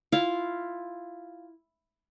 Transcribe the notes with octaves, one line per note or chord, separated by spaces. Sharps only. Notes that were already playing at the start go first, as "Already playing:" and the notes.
E4 F4 F5